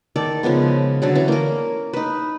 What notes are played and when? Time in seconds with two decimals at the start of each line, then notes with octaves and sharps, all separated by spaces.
0.16 D#3 A4 D5
0.43 C#3 F3 G#3 B3
1.02 D3 F#3 A4
1.15 E3 C#4
1.28 A#3 A#4
1.93 D#4 B4